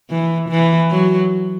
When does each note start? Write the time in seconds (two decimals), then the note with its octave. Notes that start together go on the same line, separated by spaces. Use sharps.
0.10 E3
0.49 E3
0.90 F#3